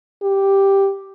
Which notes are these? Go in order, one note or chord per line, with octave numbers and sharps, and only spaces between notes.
G4